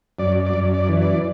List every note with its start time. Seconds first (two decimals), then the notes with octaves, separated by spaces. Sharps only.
0.19 F#2 D5
0.46 D5
0.54 F#2
0.74 D5
0.89 E3
1.02 D5